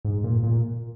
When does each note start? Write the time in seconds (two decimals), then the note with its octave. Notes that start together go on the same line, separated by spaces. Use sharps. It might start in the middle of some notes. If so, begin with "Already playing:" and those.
0.05 G#2
0.24 A#2
0.43 A#2